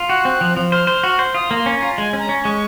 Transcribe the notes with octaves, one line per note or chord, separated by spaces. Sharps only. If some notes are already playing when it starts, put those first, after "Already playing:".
Already playing: F4
F#4 F#6
C4
F3
F3
C5 F6
C5
F#4
C5
F4 D#6
A#3 C6
C#4
A#5
F4
G#3 G#5
C#4
A#5
C#4
C#6
G#3